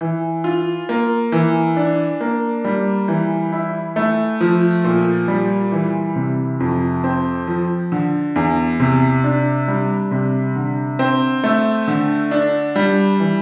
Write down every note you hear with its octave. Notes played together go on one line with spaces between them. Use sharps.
E3
F4
A#3
E3
D4
A#3
G3
E3
E4
A3
F3
A#2
G3
E3
C3
F2
C4
F3
D3
E2
C3
D4
G3
C3
D3
C4
A3
D3
D4
G3
E3